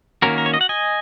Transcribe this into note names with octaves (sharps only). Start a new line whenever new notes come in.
D#3 A#3 C#4 F#4 A#4
A#4
C#5
D#5
F#5
D#5 G#5